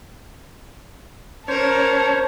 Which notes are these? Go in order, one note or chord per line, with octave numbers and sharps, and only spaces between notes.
C#4 A#4 C5 C#5 A5